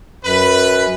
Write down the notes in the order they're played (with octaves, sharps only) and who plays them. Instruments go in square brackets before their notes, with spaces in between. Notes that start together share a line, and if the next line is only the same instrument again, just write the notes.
[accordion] F#2 [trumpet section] B4